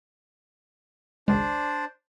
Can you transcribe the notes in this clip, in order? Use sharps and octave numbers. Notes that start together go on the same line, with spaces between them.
G#1 C#2 G#3 D4 C5 D5